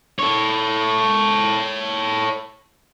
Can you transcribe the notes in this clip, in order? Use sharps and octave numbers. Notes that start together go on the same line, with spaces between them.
A4 C#5